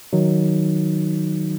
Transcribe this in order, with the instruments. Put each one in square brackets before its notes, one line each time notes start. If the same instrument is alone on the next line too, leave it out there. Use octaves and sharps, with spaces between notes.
[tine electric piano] D#3 F#3 D#4